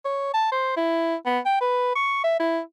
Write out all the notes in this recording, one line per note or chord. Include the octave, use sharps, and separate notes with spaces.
C#5
A5
C5
E4
B3
G5
B4
C#6
E5
E4